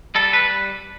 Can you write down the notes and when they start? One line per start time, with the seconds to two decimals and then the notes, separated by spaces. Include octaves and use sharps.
0.15 G3 A4
0.33 B4